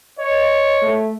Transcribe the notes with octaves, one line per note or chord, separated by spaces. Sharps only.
C#5 D#5
A3